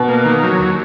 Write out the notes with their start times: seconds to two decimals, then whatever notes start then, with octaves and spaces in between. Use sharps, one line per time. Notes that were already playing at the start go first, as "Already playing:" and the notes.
Already playing: B2
0.08 A#3
0.25 D#3
0.43 F#3
0.59 D#2